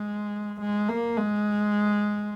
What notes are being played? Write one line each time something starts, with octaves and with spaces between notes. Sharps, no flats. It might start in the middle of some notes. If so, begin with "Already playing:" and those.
Already playing: G#3
G#3
A#3
G#3